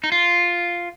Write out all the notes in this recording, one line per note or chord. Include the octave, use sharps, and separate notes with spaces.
D#4
F4